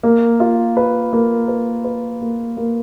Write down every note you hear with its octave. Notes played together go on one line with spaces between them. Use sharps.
A#3
F4
B4
A#3
B4
B4
A#3
A#3